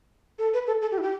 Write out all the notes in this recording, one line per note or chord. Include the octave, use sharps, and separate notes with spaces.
A4
B4
A4
A4
G4
E4
G4